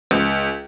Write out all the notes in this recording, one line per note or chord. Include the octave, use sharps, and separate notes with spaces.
C#2